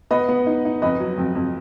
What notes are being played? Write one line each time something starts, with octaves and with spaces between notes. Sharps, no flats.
B3 B4 D#5
B3
D#4
D#4
F2 B4 D#5
F#3
F2
F2